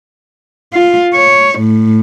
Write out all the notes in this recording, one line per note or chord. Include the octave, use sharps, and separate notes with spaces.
F4
C#5
A2